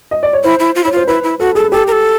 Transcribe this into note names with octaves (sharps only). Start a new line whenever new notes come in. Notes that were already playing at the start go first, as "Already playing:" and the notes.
D#5
D5
C#5
E4 C5
E4
F4
E4 C#5
F4 C5
E4 B4
E4
F#4 A4
G#4 A4
G4 A4
A#4
A4